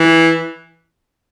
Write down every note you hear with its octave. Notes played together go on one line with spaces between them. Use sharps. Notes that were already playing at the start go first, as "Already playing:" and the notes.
Already playing: E3